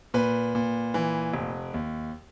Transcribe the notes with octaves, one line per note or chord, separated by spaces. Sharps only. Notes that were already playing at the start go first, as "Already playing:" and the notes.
A#2 B4
A#2
E3
F1
D#2